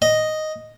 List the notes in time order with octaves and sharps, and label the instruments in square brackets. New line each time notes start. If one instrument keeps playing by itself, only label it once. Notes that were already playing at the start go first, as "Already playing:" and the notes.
[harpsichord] D#5